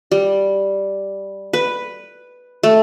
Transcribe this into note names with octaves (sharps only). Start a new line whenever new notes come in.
G3
B4
A3